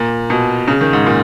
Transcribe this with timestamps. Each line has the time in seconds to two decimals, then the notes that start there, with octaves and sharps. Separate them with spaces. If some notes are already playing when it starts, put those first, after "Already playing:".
Already playing: A#2
0.30 B2
0.68 C#3
0.81 D#3
0.93 G#2
1.06 A#2